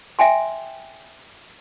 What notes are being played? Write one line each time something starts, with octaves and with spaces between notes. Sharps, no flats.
E5 G5 G#5 C6